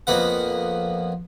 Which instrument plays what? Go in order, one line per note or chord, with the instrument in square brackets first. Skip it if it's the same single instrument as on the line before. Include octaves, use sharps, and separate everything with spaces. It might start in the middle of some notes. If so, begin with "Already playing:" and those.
[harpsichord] F2 A#3 B3 F#5